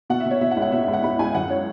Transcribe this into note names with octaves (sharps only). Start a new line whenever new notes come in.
B2 F#5
E5
B2
C#5
B2 E5
F#5
C#2
F#5
B2 E5
E5
C#2
F#5
C#2 B5
C#2 G#5
F#2 F#5
C#5